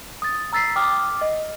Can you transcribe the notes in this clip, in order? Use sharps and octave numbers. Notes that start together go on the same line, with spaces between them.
D#6 A6
A#5 E6 A6 B6 C7
G5 D6 D#6 F6
D#5